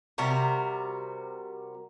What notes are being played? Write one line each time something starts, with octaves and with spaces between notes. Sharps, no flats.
C3 G3 F#4 A#4